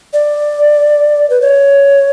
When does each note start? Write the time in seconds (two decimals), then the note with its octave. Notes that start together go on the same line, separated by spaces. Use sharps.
0.13 D5
1.30 B4
1.41 C#5